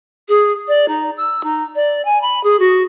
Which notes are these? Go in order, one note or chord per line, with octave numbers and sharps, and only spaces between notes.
G#4
D5
D#4
E6
D#4
D5
G#5
B5
G#4
F#4